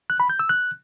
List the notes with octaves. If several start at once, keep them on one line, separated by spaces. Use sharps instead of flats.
F#6
B5
G6
E6
F#6